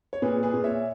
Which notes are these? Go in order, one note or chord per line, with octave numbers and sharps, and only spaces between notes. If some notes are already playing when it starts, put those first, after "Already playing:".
C#5
A#2 G#4 B4
G#4 B4
A#2
C#5 E5